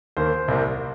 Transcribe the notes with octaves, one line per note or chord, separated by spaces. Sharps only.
D#2 D#3 A#3 C5
C2 C3 G3 A#3